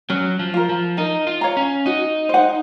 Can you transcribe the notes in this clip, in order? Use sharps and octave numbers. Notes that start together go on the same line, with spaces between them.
F#3 C#4
F3
F4 A#4
F3
D#4 A#4
F4
C#5 F5 A#5
C#4
D#4 F#4
C5 F#5